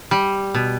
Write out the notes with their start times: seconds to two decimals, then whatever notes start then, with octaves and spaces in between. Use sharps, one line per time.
0.11 G3
0.55 B2